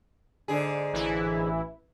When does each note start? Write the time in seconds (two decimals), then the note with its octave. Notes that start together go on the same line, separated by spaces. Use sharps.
0.48 G#2 D3 G#4
0.93 A1 E3 E4